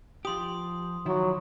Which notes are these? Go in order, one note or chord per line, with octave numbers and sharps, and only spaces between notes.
F3 G4 C6 D#6
D#3 F3 F#3 E4